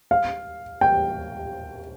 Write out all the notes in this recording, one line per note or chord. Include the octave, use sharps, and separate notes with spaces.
F5
G5